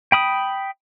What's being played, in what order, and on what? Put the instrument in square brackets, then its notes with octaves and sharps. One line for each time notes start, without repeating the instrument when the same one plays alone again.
[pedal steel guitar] G5 B5 D#6